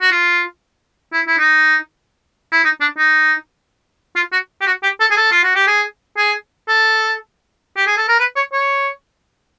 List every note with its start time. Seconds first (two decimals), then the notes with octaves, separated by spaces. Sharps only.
0.01 F#4
0.12 F4
1.13 E4
1.27 E4
1.38 D#4
2.52 E4
2.64 D#4
2.81 D4
2.98 D#4
4.16 F4
4.32 F#4
4.61 G4
4.66 F#4
4.83 G4
5.00 A4
5.11 G#4
5.17 A4
5.31 F4
5.43 F#4
5.55 G4
5.67 G#4
6.17 G#4
6.68 A4
7.77 G4
7.87 G#4
7.97 A4
8.09 A#4
8.19 B4
8.36 C#5
8.53 C#5